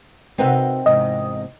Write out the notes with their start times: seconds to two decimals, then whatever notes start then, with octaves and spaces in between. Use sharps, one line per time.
0.38 C3 C4 D#4 F#4 A#4 B4
0.86 E2 G#2 C3 D#5